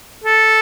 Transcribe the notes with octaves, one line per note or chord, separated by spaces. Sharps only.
A4